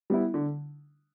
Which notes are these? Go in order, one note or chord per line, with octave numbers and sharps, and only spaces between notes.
G3 B3 E4
D3